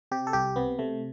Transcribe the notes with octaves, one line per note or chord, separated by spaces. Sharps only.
C3 G4
A4
C2 G4
C3 B3
C3 A3